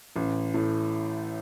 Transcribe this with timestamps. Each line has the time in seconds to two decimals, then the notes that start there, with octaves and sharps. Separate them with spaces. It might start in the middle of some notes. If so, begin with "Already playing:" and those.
0.16 A1
0.54 A2